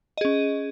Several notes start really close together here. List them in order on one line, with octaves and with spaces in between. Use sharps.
D#5 G#4 C#4